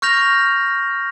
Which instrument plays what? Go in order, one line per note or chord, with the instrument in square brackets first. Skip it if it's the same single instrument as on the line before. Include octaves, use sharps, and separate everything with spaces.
[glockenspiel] C#6 F6 G6 A#6 F7